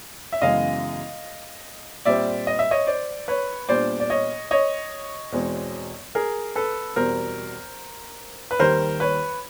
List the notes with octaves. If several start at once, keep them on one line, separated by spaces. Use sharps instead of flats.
E5
F#2 C#3 E3 G#3 B3 D#5 F5
A#2 G3 C4 D5 E5
D#5
E5
C#5 D#5
C5 D5
B4 C#5
A#2 G3 B3 D4 C5 D5
D5
C#5 D#5
C#5 D#5
E2 B2 G#3 C4
G#4 A#4
A4 B4
E2 B2 G3 C4 A#4 C5
B4
D#2 D#3 G3 A#4 C5
B4 C#5